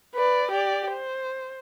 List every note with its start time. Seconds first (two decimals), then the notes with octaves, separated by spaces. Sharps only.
0.15 B4 D5
0.51 G4 D5
0.92 C5